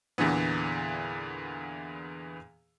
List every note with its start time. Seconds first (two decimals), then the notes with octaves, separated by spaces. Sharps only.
0.18 E2 A#2 D3 E3 B3